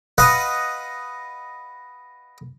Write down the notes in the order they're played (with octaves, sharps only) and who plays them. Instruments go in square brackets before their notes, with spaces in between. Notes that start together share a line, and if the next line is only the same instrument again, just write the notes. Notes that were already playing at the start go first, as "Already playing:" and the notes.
[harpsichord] B4 D#5 F5 F#5